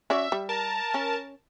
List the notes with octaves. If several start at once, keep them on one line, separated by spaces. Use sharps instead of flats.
C#4 F#4 D5 E5
G3
A#4 A5
C#4